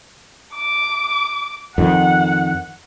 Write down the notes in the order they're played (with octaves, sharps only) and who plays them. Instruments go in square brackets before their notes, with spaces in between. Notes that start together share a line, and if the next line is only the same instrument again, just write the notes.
[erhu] D6
[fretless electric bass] F2 D#3 [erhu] F#5